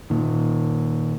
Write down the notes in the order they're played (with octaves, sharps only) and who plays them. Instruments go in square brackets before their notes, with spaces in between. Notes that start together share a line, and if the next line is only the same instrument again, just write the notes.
[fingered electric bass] A#2 D#3